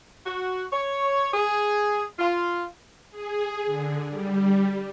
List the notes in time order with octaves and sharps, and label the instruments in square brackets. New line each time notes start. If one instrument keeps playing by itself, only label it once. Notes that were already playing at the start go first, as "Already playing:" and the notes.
[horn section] F#4
C#5
G#4
F4
[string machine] G#4
D3
G3